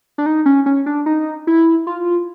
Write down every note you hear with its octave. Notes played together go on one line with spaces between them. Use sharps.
D4
D#4
C#4
C#4
D4
D#4
E4
F4